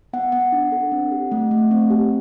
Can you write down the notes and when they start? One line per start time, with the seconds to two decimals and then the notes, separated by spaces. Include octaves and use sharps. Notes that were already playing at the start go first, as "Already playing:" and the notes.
0.13 B3 F#5
0.32 B3 F#5
0.52 D4
0.72 A4
0.92 C4
1.11 G4
1.32 A3
1.51 A3
1.71 C4
1.90 G4